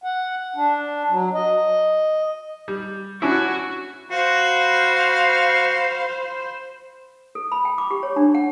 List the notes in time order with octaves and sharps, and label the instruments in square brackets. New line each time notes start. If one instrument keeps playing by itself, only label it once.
[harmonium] F#5
D4
F#3
D#5
[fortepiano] G3
[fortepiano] C#4 D4 E4 [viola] F#4
[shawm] F#4 [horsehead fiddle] C5 B5 [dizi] F5
[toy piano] A4
B5
G5
D6
G4
C#5
D4
F#5